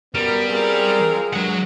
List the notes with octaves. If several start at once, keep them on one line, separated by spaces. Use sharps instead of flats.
F#2 G3 B3 A#4
C4 F4 G#4 A#4
G2 F#3 G#3 F#5